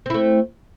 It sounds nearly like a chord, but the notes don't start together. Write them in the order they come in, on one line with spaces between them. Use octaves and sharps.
C4 E4 A3